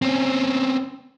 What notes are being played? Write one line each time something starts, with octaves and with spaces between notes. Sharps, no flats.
C4 C#4